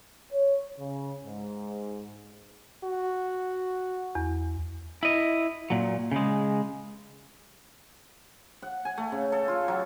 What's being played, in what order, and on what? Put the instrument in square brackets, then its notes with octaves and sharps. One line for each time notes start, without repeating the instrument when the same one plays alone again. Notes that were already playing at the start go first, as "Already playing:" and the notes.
[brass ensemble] C#5
C#3
G#2
[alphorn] F#4
[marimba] E2
[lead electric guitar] E4 D#5
A#2 F#3
C#3 G#3
[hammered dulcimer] F#5
G#5
A3
C#3
A4
F4
F#3